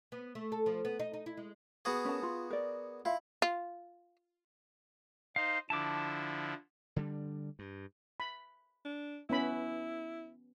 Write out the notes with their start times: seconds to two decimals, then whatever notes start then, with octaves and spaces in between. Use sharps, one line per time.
0.12 B3
0.35 A3
0.52 A4
0.66 F3
0.85 B3
0.99 D#4
1.14 D#4
1.26 E4
1.37 G#3
1.85 B3 F#4 G#4
2.05 C#4 A#4 A5
2.23 F4
2.50 A#4 D5
3.05 E4 F4 E5 F5
3.42 F4
5.36 D#4 C5 F5
5.70 D3 F3 E4 A5 D6
6.96 D3 G3 D4
7.59 G2
8.20 B5
8.85 D4
9.30 B3 C#4 E4 B5